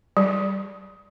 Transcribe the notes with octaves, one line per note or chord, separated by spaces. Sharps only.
G3